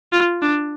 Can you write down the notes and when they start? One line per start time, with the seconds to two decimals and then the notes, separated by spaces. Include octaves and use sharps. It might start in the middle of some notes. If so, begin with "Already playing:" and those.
0.13 F4
0.42 D4